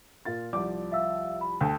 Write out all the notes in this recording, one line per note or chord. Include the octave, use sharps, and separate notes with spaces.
A#2 F4 A6
C2 F3 D5 D6
E5 F5 E6
B5
D2 G5 A5